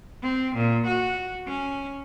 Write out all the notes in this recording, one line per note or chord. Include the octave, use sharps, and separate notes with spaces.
C4
A#2
F#4
C#4